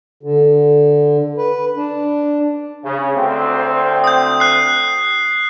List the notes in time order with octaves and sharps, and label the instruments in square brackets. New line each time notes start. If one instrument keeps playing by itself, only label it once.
[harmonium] D3
B4
D4
[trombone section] C#3
D2 C4
[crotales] D#6 G6
F#6 C7